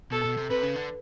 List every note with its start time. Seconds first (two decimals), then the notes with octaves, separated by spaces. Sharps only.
0.12 B2 A4
0.25 B2
0.37 C3
0.50 C3 B4
0.63 C#3
0.76 D3